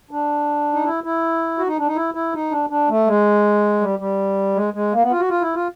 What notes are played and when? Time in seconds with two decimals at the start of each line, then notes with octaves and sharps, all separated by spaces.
0.11 D4
0.74 D#4
0.85 E4
1.04 E4
1.58 F#4
1.68 D#4
1.78 D4
1.87 D#4
1.96 E4
2.14 E4
2.34 D#4
2.51 D4
2.70 D4
2.89 A3
3.07 G#3
3.81 G3
3.99 G3
4.55 G#3
4.74 G#3
4.93 A#3
5.02 B3
5.11 F4
5.20 F#4
5.30 F4
5.42 E4
5.55 F4